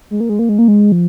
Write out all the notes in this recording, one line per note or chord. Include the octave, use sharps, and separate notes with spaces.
G#3
A#3
G#3
A#3
G#3
A#3
G#3
F3